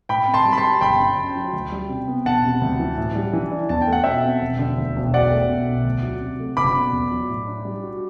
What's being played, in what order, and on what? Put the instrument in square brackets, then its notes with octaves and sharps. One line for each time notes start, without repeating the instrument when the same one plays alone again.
[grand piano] A2 [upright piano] G5 B5
[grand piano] C4
[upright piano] A5 C6
[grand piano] G3
[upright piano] B5
A5 C6
[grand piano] G4
[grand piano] G1 [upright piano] G5 B5
[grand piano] D3
F#2
F#3
D2
G3
C3
B3
[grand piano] E1 [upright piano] F#5 A5
[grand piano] C3
D2
E3
A2
G3
E3
D4
[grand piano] E2 [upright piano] A5
[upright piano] G5
[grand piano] A3
[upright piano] F#5
[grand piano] B2 [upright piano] E5 G5
[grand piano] C4
E1
D3
D2
E1
[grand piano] B1 [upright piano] D5 F#5
[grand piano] A3
B2
B1
D2
F#3
C3
A3
[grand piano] F#1 [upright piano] B5 D6
[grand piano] B2
E2
F#3
A2
D4
G3
F#4